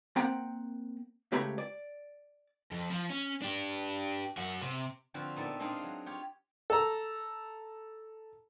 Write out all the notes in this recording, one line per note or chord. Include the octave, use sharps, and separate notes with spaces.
A#3 C4 F#5 G5 A#5
C#2 A3 G4 B4 C#5 A#5
D5
F2
F3
C#4
D4 G4
F#2 F#4
C3
D3 F3 C4 F4 F#4 B4
A#2 B3 D#4 A4 D5 E5
G#3 C4 D4 D#4 F4 G#4
F5
F#3
F4 G4 C#5
A4 A#5